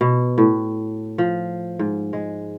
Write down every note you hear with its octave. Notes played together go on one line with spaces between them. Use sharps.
B2
A2
F3
G#2
G#3